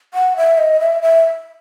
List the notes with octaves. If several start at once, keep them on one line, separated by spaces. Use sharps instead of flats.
F#5
E5
D#5
E5
E5